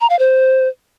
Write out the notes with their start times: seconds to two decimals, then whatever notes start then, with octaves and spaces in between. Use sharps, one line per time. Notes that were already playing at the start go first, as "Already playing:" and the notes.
0.01 A#5
0.10 F5
0.19 C5